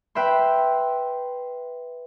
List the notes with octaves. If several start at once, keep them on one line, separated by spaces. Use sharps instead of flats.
B4 E5 G5 C6